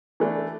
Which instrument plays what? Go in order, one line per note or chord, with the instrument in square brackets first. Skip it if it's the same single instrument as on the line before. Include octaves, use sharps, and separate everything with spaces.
[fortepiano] E3 A3 D4